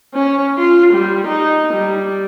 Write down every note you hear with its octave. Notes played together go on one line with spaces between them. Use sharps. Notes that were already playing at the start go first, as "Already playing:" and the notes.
C#4
F4
G3
D#4
G3